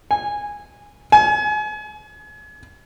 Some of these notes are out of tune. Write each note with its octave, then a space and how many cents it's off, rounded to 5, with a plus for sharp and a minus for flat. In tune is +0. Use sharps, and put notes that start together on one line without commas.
G#5 -15
G#5 +35